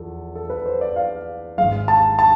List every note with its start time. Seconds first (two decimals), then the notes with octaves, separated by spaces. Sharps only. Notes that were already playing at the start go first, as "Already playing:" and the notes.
Already playing: E2 F3 B3 A4
0.35 A4
0.50 B4
0.66 C5
0.81 D5
0.96 F5
1.58 G#1 G#2 G#3 F5
1.88 A5
2.19 A5